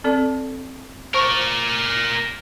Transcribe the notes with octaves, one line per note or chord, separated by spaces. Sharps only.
C4 A4 D5
A#4 C5 D5 C#6